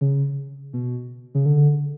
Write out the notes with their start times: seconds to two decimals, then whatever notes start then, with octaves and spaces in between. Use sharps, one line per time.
0.01 C#3
0.73 B2
1.35 C#3
1.46 D3